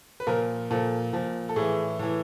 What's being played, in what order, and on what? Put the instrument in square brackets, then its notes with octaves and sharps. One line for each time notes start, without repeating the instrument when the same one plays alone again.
[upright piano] B4
A#2 F3 A#4
A#2 F3 A4
A#2 F3
A4
A2 E3 G#4
A2 E3